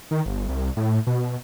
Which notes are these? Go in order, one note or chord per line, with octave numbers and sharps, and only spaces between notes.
D#3
G1
C2
A2
B2